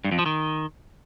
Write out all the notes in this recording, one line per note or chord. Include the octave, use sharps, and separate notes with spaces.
G2
F2
F3
D#3